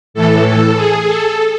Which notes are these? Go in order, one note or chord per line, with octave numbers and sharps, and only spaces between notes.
A2 E3 A4
A4
G#4
A4